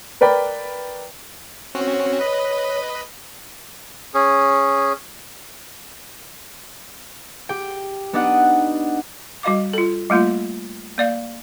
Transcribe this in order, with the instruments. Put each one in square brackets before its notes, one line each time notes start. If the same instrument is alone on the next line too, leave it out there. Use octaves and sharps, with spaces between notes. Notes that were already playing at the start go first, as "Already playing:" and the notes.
[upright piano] A#4 B4 D5 G5 B5
[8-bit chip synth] C4 C#4 F#4 [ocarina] C#5
[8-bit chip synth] B4 D#5 B5
[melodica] C#4 G#4
[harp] G4 G5
B3 D4 D#4 D5 D#5 F#5
[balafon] G3 F#4 D#5 F5 D6
F4 A4
G3 A3 A#3 F4
A#3 D5 F5